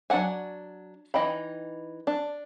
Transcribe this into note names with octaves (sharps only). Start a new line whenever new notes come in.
F#3 D4 D5 F#5 G#5
E3 D#4 D#5 G5 B5
D4